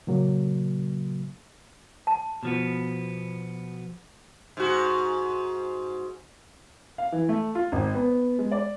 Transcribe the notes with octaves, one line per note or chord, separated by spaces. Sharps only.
A#2 C#3 F#3 A#3
A5
B2 F3 B3
G#2 F#4
F5
E3
A3
F4
G#1
B3
G#3
D5